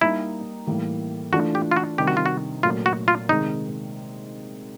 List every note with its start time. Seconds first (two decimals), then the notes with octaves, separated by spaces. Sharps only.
0.01 G3 A#3 D#4 E4
0.67 A2 E3 G3 A#3
1.33 E3 A3 D4 F4 F#4
1.55 G4
1.71 F4
1.76 F#4
1.98 C3 D#3 G3 G4
2.07 F#4
2.17 F4
2.26 F#4
2.63 A#2 F#3 A3 F4
2.86 F#4
3.08 F4
3.29 C3 D#3 G#3 D#4